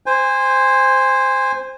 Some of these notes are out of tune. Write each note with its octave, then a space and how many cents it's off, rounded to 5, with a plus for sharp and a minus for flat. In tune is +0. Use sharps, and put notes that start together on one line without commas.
C5 +0 G#5 -25